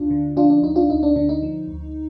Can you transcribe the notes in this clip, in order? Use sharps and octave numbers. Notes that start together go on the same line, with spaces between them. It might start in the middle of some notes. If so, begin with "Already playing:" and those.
Already playing: D2 D4 F4
D3
F3 D4 F4
D4
D2 D#4
D4 F4
D2 D#4
D4
D3 D4
D#4
F3
D2